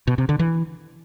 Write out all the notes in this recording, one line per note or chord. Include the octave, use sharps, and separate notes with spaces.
B2
C3
D3
E3